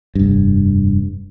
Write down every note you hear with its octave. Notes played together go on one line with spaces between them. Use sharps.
F1 G2